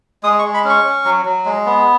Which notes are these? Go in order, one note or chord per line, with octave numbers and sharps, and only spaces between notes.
G#3 D#6
C#6
G#3
B5
C#4 C#6
C#4
F#3
F#3
G#3
B3